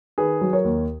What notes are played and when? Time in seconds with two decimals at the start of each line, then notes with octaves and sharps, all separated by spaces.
0.18 D#3 G#4 B4
0.41 F#3
0.53 A#4 C#5
0.64 D#2